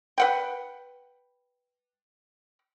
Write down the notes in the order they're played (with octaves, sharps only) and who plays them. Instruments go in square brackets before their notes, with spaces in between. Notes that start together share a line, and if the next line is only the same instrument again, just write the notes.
[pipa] B4 F#5 G5